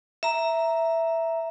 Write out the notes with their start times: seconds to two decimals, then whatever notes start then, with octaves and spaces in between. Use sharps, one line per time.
0.23 E5 A#5